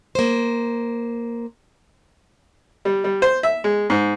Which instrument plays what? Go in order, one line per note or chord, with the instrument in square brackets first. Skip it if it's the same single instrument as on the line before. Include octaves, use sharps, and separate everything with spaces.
[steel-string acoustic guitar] A#3 C5
[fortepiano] G3
G3
C5
E5
G#3
G#2